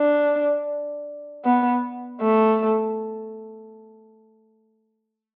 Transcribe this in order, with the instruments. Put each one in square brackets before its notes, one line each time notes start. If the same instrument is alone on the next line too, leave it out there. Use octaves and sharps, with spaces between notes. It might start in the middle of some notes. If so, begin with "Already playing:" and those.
Already playing: [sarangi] D4
B3
A3